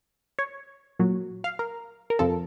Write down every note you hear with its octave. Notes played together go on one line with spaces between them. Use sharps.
C#5
A#2 F#3
F5
A#4
A#4
F2 C3 F3 A4